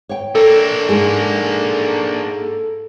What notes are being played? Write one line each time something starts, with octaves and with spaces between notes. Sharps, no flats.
C#5 G5
A#3 D4 A4
G#2 G#3 G#4